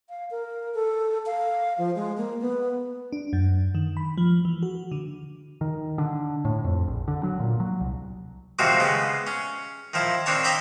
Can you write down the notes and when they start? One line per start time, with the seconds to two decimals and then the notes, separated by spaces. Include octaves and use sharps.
0.09 F5
0.31 A#4
0.74 A4
1.26 F5
1.78 F3
1.96 G#3
2.17 A#3
2.41 B3
3.12 D4
3.33 F#2
3.75 D#3
3.97 B5
4.18 F3
4.45 E3
4.63 F#4
4.92 D3
5.61 D#3
5.98 D3
6.45 A2
6.64 F2
6.87 A#1
7.08 D3
7.23 F#3
7.40 A#2
7.60 F#3
7.80 C2
8.59 G#2 C3 D#3 F3 C4 F#4
8.80 C#3 G#3 B3
9.27 C#4
9.93 D#3 F3 E4
10.26 D#3 C4 D4 C#5 A5
10.44 D#5 E5 G5 A#5 B5 D6